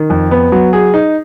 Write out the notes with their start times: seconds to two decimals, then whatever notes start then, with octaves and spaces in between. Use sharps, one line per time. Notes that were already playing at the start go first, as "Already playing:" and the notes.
Already playing: D#3
0.10 F2
0.31 B3
0.52 F#3
0.73 G#4
0.94 D#4